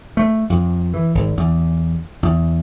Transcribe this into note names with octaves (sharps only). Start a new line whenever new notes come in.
A3
F2
E3
G#1
E2
E2